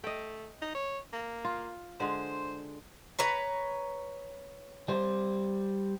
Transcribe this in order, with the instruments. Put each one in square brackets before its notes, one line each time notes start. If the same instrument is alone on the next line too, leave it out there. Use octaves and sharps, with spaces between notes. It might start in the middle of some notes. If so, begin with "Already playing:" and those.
[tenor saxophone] A3 [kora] D#5 G5
[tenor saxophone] D#4
C#5
A#3
[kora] F4
[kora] D3 G#3 [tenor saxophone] C5
[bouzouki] B4 C#5 A#5
[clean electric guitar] G3 C5